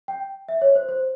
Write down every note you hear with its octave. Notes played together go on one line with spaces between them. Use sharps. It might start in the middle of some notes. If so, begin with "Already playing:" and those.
G5
E5
C#5
C5
C5